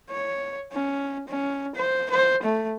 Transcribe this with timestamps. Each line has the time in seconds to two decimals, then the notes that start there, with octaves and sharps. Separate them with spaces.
0.11 C#5
0.72 C#4
1.28 C#4
1.75 C5
2.10 C5
2.43 A3